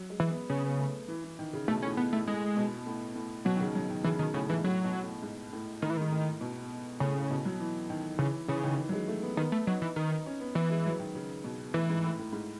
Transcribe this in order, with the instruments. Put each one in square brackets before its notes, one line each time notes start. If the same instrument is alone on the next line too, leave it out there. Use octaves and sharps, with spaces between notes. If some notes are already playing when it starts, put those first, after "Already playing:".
Already playing: [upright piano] F#3
G#3
[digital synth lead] E3
[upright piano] B3
[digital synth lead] C#3 [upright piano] B3
[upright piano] B3
A3
E3
E3
D#3
C#3
[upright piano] B2 [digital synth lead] A3
[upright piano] A2 [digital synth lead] C#4
[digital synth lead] B3
[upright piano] A2 [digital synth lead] A3
[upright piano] A2 [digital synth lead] G#3
[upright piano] B2
A2
A2
[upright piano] B2 [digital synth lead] F#3
[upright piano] D#3
C#3
F#3
D#3
[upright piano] C#3 [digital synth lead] E3
[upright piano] B2 [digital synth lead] D#3
[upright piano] A2 [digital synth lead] C#3
[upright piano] G#2 [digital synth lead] E3
[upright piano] A2 [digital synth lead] F#3
[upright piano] B2
A2
G#2
A2
[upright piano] A2 [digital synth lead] D#3
[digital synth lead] E3
[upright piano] G#2 [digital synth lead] D#3
[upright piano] A2
B2
[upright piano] A2 [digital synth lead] C#3
[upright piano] A2
B2
F#3
E3
D#3
[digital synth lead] C#3 [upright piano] E3
[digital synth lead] C#3 [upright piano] E3
[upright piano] D#3
E3
F#3
G#3
A3
B3
[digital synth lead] D#3 [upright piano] B3
[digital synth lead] A3
[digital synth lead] F#3 [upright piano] D#4
[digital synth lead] E3
[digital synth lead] D#3 [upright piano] D#4
[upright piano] D#4
C#4
B3
[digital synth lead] E3 [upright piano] B3
[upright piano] G#3
F#3
D#3
C#3
B2
[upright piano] A2 [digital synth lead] E3
[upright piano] G#2
A2
A2
G#2